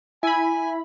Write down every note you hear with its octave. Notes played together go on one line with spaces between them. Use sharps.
E4 G#5 B5